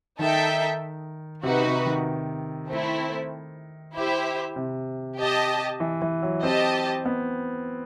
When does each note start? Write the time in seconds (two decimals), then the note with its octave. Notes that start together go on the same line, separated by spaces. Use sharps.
0.19 D#3 D#4 A4 E5 G5
1.43 C3 D#4 F#4 B4
1.65 C3
1.86 D#3
2.69 A3 C4 E4
3.94 E4 G4 C5 E5
4.56 C3
5.18 G4 D#5 A5
5.80 E3
6.02 E3
6.23 F#3
6.43 C4 G4 D#5 A5
7.05 B3